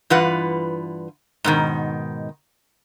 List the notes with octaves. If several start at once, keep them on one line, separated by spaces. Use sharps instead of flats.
G2 E3 F4 B4 F#5
G#2 B2 D#3